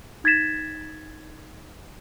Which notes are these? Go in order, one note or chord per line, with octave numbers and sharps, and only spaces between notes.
D#4 G#6 A6 B6 E7